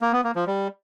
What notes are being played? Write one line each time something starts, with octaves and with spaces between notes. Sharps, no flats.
A#3
B3
A#3
F3
G3